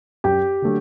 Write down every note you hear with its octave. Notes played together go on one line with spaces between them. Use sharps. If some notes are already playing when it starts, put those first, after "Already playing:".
F#2 G4 G5
D3 F#3 A3